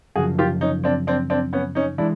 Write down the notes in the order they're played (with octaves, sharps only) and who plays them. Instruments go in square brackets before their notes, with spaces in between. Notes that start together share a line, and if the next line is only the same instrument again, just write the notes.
[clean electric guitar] F#2 C#3 F3 [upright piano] F#4 G#4
[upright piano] F4 G4
C#4 D#4
C4 D4
C4 D4
C4 D4
B3 C#4
C#4 D#4
[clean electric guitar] E3 G#3 [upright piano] D4 E4